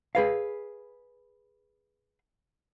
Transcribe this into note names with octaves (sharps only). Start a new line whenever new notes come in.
G#4 B4 F5